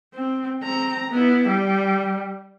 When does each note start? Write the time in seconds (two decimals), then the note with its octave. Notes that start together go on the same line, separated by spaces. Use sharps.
0.14 C4
0.62 C4 A#5
1.10 B3 E4
1.47 G3